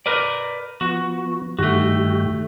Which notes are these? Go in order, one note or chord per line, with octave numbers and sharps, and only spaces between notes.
A#4 B4 D5
F3 B3 F#4
G2 D#3 A3 F#4 G4